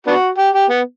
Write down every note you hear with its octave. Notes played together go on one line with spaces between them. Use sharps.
B3 D4 F#4
G4
G4
B3